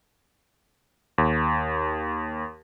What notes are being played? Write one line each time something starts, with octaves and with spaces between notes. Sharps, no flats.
D#2